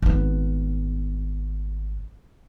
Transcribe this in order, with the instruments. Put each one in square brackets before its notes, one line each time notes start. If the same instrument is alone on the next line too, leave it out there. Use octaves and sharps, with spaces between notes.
[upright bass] G#1 B3